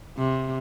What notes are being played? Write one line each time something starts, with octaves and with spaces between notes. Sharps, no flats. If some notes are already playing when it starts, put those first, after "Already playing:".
C3